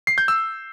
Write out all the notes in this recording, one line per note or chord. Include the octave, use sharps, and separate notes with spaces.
C7
G6
E6